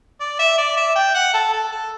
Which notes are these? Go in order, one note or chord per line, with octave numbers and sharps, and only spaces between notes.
D5
E5
D5
E5
G5
F#5
A4
A4
A4